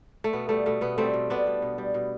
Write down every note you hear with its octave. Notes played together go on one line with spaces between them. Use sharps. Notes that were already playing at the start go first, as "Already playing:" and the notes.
A3
B2 B3
G3 A3
B2 A3
B2 B3
G3 A3 C4
B2
B2 B3 D4
G3
B2
G3
B2